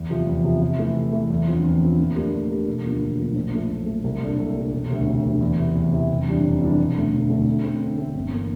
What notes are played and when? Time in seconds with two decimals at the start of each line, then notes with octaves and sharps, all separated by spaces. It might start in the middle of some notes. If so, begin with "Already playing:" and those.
Already playing: E2
0.10 C3 F3
0.27 E2
0.44 C3 F3
0.62 C3
0.79 E3 A3
0.96 C3
1.12 E3 A3
1.30 E2
1.47 D3 F3 C4 F4
1.64 E2
1.81 D3 F3 C4 F4
1.98 A#2
2.16 A3 D4 G4 A#4
2.33 A#2
2.50 A3 D4 G4 A#4
2.66 E1
2.84 D2 D3 F3 A#3
3.01 E1
3.18 D2 D3 F3 A#3
3.35 A#1
3.53 A#2 F3 A3
3.70 A#1
3.86 A#2 F3 A3
4.04 C2
4.21 A#2 G3 D4 A4
4.38 C2
4.55 A#2 G3 D4 A4
4.72 E1
4.90 D2 C3
5.06 E1
5.24 D2 C3
5.41 E2
5.58 C3 E3
5.75 E2
5.92 C3 E3
6.10 F1
6.26 E2 E3 G3 D4
6.44 F1
6.61 E2 E3 G3 D4
6.78 E1
6.95 D2 D3 A3
7.13 E1
7.29 D2 D3 A3
7.46 D3
7.64 A3 C4
7.81 D3
7.98 A3 C4
8.15 G1
8.32 E3 A#3